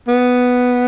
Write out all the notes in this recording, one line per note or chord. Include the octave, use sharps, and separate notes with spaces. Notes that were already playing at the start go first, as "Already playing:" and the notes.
B3